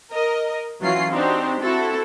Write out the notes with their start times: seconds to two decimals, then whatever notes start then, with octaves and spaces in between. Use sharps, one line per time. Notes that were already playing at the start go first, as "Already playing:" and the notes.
0.12 A#4 D#5
0.80 E3 F#3 C#4 F4 C7
1.11 C4 D4 D#4 F#4 G4 C5
1.61 C4 E4 F#4 A4